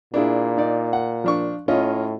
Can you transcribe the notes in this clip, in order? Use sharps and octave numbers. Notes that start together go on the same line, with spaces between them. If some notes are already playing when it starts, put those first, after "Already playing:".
A#2 D4 E4 G#4
D#4 D5
F#5
F3 D4 C#6
A2 C#4 F4 D#5